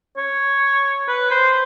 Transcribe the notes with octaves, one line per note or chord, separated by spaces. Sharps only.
C#5
B4
C5